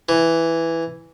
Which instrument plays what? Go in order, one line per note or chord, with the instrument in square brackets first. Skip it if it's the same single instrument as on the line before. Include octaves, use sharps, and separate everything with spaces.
[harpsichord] E3